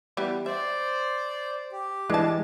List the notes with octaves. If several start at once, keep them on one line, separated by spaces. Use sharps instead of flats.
E3 G3 B3
C5 D5 E5
G4
E3 G#3 D4 A5